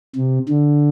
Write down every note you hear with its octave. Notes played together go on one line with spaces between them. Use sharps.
C3
D3